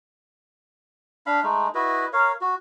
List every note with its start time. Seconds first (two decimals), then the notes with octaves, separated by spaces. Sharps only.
1.26 D4 F5 B5
1.43 G#3 A3 D#4
1.75 E4 F#4 B4 D#5
2.13 A#4 C#5 F5
2.41 F#4